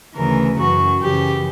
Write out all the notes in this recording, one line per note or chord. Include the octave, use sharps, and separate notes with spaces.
D2 C#3 E3 A#4
F#2 E3 F#4
F#2 C#3 E3 G4